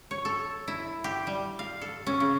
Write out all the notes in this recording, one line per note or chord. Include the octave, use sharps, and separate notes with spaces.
C#5
A4
E4
G4
G3
F5
A4
C#4
C#3